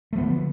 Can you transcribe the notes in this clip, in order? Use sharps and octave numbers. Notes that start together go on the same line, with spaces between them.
D3 F3 A3 B3